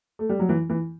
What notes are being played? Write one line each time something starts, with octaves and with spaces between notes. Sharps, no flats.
A3
G3
F#3
E3
E3